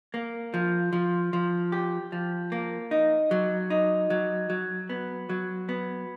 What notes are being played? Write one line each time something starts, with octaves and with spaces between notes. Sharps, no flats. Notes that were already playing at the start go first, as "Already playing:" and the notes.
A#3
F3
F3
F3
G4
F3
A#3
D#4
F#3
D#4
F#3
F#3
B3
F#3
B3